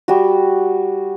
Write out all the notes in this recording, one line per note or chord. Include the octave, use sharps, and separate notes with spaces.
G3 F#4